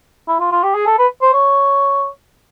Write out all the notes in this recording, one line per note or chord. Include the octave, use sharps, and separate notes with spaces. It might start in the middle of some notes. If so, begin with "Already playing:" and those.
E4
F4
F4
G4
G#4
A4
B4
C5
C#5